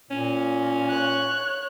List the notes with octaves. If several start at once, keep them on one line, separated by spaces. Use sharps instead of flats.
A#2 C#4
C#5 F#6